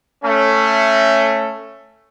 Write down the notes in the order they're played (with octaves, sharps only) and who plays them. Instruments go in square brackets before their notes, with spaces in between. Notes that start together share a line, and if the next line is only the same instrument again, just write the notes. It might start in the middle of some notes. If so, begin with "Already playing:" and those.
[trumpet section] A3 C#4